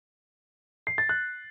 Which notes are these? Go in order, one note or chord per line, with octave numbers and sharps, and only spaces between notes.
C7
A6
F#6